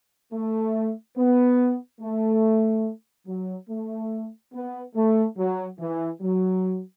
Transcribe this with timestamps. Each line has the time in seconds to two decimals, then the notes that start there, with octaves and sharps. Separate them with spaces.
0.33 A3
1.17 B3
2.01 A3
3.27 F#3
3.69 A3
4.53 B3
4.95 A3
5.37 F#3
5.79 E3
6.21 F#3